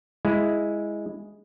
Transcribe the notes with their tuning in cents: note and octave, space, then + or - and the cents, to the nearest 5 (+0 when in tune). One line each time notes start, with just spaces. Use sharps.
G#3 +0 E4 +0